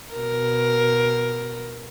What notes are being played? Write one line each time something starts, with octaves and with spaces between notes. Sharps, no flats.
B2 A#4